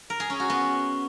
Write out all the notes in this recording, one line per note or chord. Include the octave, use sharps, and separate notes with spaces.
A#4
G#4
C#4
F#4
B3